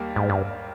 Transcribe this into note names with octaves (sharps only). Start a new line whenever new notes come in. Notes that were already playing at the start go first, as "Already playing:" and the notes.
Already playing: D#2 G3 A#3
G#2
G2